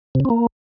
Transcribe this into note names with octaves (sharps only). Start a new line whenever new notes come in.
C3
C#3
C4
A#3